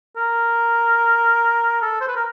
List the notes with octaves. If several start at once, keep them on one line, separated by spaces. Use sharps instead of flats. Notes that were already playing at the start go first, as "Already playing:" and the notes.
A#4
A4
C5
B4
A#4